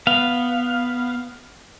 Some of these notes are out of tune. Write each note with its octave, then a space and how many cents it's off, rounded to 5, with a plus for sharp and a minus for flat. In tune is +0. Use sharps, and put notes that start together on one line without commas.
B3 +0 F5 +0